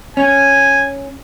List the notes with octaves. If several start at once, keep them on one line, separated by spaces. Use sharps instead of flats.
C#4 G#5